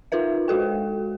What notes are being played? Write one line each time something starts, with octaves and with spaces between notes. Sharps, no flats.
D#4 F4 A#4 B4 E5
G#3 F#4 A4 G5